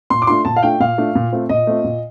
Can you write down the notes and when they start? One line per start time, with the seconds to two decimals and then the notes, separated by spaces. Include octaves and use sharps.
0.10 A#2 C6
0.22 D6
0.27 A3 D4 F4 C6
0.45 A#2 A5
0.56 F5
0.63 A3 D4 F4 G5
0.80 A#2 F5
0.98 A3 D4 F4
1.15 A#2
1.32 A3 C4 F4
1.49 A#2 D#5
1.67 A3 C4 F4
1.84 A#2